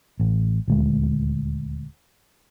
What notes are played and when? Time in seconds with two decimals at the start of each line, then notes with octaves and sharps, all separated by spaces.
0.20 A1
0.68 D#1 D2 G#3